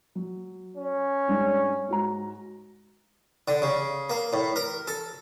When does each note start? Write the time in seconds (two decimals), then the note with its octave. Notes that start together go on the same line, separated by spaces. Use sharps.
0.15 F#3
0.77 C#4
1.28 G#2 G3 D4
1.88 G#2 F#4 A#5
3.48 D3
3.62 C#3
4.10 A#3
4.33 A2
4.56 A#4
4.87 A4